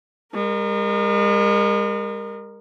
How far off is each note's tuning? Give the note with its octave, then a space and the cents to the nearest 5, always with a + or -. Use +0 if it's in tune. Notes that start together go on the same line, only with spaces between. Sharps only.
G#3 -40 A#4 +0